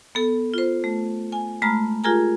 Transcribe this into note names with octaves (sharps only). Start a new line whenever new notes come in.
B3 A4
F4 C5
A3
G#5
G#3 A3 A#5 B5 F6
F4 G4 G#4 A#4 G#5 A#5